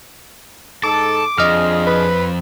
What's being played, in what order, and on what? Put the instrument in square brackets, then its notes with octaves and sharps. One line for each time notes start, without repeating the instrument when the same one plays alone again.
[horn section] G#2 D#4 A4 [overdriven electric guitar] A5 [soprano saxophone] D6
[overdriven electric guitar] F2 [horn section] F3 D4 G#4 [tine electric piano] D#5 F6
[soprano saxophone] B4